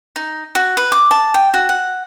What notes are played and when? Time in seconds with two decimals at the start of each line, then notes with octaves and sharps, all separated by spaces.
0.16 D#4
0.55 F#4
0.77 B4
0.92 D6
1.11 A5
1.34 G5
1.54 F#4
1.69 F#5